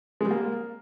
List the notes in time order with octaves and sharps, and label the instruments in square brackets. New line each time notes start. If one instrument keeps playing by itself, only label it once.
[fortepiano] G#3
G3
A#3